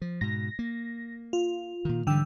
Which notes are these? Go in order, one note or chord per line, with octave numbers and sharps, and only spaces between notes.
F3
G#2 B2 A#6
A#3
F4
A#2 D#3
G#2 D3 E3 G3 G5 E6